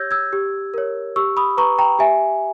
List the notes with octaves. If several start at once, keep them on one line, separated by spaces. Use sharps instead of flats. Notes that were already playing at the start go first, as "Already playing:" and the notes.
Already playing: G4 C#5 E6 G6 G#6 A#6
E6 G#6
G4
A#4 C#5
G4 C#6 E6
B5 D#6
B4 A#5 C#6
G5 A#5
G4 E5 G#5